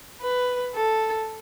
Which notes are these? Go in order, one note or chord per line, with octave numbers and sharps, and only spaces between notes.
B4
A4